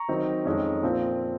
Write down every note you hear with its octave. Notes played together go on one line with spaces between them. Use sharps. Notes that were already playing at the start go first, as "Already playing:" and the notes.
Already playing: A#5 C#6
D#3 F#3 C4 D#4
F2 D#3 G#3 C#4
A#2 F3 C4